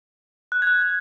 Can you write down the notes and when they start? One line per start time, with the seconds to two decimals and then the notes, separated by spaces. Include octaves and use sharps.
0.52 F#6
0.62 G#6
0.67 F#6
0.81 G#6